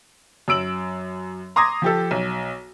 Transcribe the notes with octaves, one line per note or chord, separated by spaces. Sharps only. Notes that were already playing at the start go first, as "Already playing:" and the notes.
F#2 E6 D7 F#7
A#5 C6 D6 D#6 G#6 A#6
F3 G4 A4
B1